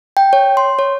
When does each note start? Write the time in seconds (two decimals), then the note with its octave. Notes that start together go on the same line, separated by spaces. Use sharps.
0.17 G5
0.33 C#5
0.57 C6
0.79 C#5